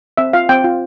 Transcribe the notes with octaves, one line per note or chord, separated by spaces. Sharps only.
C4 E5
F4 F5
C4 G5
F4